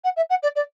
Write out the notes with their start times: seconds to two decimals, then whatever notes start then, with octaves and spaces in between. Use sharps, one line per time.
0.04 F#5
0.16 E5
0.29 F#5
0.42 D5
0.55 D5